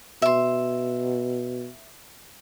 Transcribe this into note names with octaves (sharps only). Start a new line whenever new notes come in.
B2 E5 C6